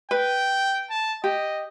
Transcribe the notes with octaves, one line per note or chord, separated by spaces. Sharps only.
B4 G5
A5
G4 D#5